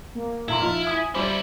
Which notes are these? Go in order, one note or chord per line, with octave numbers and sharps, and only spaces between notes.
A#3
A#2 E4 A#5 C6
F3 D#4 F4 F6
G#5 D#6
G3 E4 F4 C5 D6